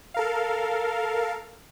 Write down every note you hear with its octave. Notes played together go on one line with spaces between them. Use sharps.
A4 A#4 F5